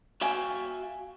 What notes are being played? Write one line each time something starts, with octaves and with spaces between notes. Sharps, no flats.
F#4 E5 F5 G5 G#5